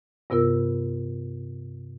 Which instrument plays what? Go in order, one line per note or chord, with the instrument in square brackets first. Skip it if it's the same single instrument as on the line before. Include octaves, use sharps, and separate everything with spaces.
[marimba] G2 C3 B3 F4 A#4 E6